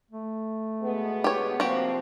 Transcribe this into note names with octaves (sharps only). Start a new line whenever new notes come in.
A3
B2 G#3 B3
G4 C#5
C3 F3 A#3 C4 F#4 G4